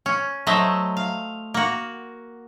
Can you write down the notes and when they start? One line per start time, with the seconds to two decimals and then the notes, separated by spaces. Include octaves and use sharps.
0.06 C#4
0.47 F#3 A3 C5 D#5 E5
0.97 F5
1.54 A#3 F#4